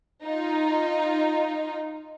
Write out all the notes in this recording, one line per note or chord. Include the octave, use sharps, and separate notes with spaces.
D#4 F4